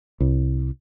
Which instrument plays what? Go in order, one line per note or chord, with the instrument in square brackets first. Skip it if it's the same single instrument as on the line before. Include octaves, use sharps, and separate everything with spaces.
[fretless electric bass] C2